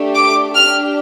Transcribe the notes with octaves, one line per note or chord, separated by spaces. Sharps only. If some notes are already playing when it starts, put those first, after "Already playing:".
Already playing: A3 D4 G4
D6
D4 G4 F6